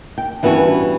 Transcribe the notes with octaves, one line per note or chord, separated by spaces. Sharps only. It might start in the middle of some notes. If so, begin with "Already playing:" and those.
G5
G2 E3 B3 C#4 F#4